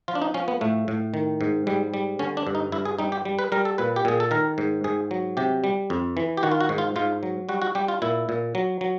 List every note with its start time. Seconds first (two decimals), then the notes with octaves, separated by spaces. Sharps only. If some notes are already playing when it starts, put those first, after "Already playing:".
0.08 F3 F4
0.15 D4
0.22 D#4
0.34 F3 C#4
0.48 B3
0.61 A2 A3
0.88 A2
1.14 D#3
1.41 G#2
1.67 G#2 G3
1.94 G3
2.19 D3 C#4
2.37 D4
2.47 G2
2.55 D#4
2.72 G2 E4
2.85 G#4
2.99 G3 D#4
3.12 G4
3.25 G3
3.39 B4
3.52 G3 A#4
3.65 A4
3.78 A#2 B4
3.96 G4
4.05 A#2 G#4
4.20 A4
4.31 D#3 A#4
4.58 G#2
4.84 G#2 G#4
5.11 F#3
5.37 C3 G4
5.64 G3
5.90 F2
6.17 E3
6.37 G4
6.43 D#3 F#4
6.51 F4
6.61 F#4
6.69 G#2
6.78 F4
6.96 G#2 F4
7.23 F#3
7.49 G3 F#4
7.62 F#4
7.75 G3 G4
7.88 F4
8.02 A#2 E4
8.29 A#2
8.55 F#3
8.81 F#3